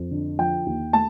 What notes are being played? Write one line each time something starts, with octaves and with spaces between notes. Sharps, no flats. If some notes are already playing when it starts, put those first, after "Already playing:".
Already playing: F2
D3
F3 G5
D#2
A3 A5